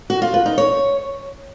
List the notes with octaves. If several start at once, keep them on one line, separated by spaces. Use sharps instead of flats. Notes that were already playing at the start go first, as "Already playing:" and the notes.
F#4
F4
B4
D#4
C#5